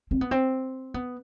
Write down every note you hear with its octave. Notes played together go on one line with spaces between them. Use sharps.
C4
B3
C4
B3